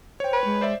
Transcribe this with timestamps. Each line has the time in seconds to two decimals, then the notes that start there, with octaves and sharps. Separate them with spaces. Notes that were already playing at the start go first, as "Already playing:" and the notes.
0.20 C5 C#5 G5
0.33 B4
0.45 G#3
0.61 C5 D5 E5